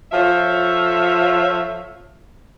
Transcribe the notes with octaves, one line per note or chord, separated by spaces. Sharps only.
F3 F4 A4 C#5 E5